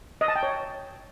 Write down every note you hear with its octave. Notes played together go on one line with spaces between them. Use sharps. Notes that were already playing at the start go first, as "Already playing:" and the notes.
D#5
A5
G5
C#5